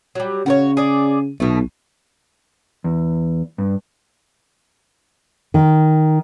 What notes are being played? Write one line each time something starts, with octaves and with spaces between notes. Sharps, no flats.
F#3 G3
C#3 F#4 A#4 C#5
G#4 D5
B1 B2 A3
E2
G2
D#3